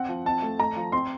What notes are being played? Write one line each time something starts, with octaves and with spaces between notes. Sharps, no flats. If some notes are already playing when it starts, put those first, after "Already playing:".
Already playing: C4 F#5
F3
C4 A5
A3
A3 A#5
F3
C4 C6